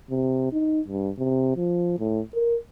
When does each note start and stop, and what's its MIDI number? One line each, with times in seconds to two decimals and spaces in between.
0.10 0.52 48
0.52 0.81 63
0.88 1.11 43
1.18 1.55 48
1.56 1.98 53
1.99 2.21 45
2.34 2.57 70